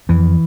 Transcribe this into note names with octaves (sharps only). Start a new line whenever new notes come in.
F2 E3